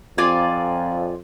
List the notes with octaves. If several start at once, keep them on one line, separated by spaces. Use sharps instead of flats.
F2 F4 D5 G#5